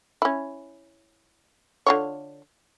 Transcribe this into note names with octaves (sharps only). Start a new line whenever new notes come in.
C#4 E4
D3 F4 C#5